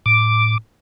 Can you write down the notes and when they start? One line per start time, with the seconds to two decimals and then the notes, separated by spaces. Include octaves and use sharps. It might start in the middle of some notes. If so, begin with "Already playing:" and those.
0.06 A2 D6